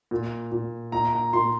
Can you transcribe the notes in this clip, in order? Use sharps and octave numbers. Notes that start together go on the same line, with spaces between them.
A#2
A#2
A#2 A#5
A#5
A#2 C6